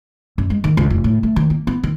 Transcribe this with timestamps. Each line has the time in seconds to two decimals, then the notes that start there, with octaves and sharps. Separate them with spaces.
0.38 F#2
0.50 G#3
0.64 D#3
0.77 C#2
0.90 F1
1.04 A2
1.23 A3
1.36 D#3
1.50 A#3
1.67 B3
1.83 D#3